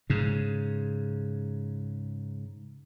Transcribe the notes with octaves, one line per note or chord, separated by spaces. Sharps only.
G#2 C#3